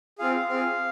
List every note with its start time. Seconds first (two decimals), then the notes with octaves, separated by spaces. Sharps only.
0.19 C4 F4 G#4 F5
0.49 C4 F4 G#4